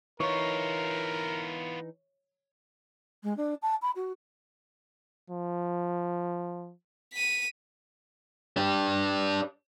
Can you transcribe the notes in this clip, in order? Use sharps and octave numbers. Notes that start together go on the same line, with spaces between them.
E3 B3 D#4 F4 A#4 C#5
G#3
D4
A5
B5
F#4
F3
B6 D#7
D4 G4